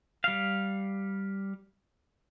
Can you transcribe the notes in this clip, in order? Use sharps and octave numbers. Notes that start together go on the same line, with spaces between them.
G3 F5